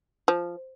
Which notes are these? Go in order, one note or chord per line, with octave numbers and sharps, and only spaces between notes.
F3